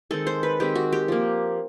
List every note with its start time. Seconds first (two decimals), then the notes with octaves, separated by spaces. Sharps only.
0.11 D#3 G#3 C4 A4
0.27 C5
0.43 B4
0.60 D#3 G#3 C4 G4
0.75 F#4
0.93 G4
1.08 F3 A#3